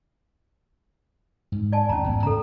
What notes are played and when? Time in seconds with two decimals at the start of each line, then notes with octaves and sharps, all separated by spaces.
1.52 G#2
1.72 D5 G#5 A5
1.89 D#2 C#4 A#5
2.04 A1 G#2 B3
2.23 C#3 A4 A#5